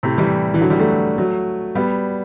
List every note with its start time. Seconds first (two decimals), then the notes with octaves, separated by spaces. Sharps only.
0.03 A2 C3
0.18 E3 G3
0.54 E3
0.61 D3 F#3
0.70 E3 G3
0.80 F#3 A3
1.18 F#3 A3
1.75 G3 B3